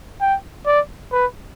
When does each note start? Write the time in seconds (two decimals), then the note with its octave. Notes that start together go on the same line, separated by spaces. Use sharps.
0.21 G5
0.66 D5
1.12 B4